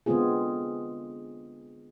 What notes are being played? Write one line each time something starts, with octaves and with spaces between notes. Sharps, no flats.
D3 G#3 B3 C4 F4 G#4